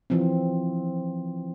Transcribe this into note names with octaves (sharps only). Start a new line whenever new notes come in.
E3 F3 C4